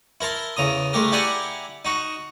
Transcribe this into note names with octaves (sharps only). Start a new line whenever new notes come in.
E4 A#4 A5 C6
E2 C#3 A#5 D#6
G#3 A3 G4 A#4
E4 G4 D5 F#5 G#5 A#5
D#4 F#4